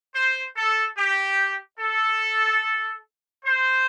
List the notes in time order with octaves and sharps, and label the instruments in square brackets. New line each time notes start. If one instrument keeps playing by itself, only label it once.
[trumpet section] C5
A4
G4
A4
C5